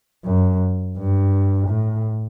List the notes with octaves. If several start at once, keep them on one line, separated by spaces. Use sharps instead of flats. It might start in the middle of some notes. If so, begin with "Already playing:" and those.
F#2
G2
A2